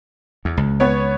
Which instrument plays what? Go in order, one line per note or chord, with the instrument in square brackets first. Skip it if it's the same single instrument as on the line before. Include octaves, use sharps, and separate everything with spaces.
[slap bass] E2
C#2
[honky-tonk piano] B3 C#5